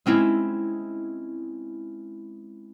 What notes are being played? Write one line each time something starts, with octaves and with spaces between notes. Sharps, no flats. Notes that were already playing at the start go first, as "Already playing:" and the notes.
G#3 C4 C#4 E4